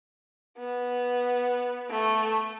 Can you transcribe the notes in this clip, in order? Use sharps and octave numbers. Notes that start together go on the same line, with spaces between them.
B3
A3